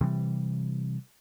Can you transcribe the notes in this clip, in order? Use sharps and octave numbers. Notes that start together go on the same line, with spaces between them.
C3 E3 G3